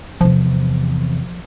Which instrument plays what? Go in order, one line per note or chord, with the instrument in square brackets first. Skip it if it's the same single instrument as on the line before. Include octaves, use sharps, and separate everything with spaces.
[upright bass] E2 C3 [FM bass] F3